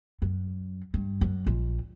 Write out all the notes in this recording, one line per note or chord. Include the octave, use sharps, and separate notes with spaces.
F#2
G2
F#2
A#1